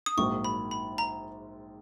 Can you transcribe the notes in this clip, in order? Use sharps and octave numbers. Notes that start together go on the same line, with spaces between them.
D#6
A#1 G#2 F#3 A#3 C#6
B5
B5
A#5